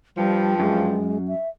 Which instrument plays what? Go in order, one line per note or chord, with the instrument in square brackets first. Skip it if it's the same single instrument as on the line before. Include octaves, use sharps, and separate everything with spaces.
[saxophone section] G2 F3 [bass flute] G3
[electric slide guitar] F#2 [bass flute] G#3
[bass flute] E5